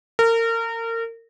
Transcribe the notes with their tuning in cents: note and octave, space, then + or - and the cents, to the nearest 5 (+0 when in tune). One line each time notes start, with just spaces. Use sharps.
A#4 -30